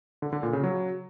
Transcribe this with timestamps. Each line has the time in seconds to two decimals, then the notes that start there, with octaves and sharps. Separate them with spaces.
0.22 D3
0.33 D3
0.43 A#2
0.53 C#3
0.64 F#3